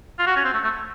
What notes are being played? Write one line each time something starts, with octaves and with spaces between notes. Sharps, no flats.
F4
F#4
C#4
C4
A3
A3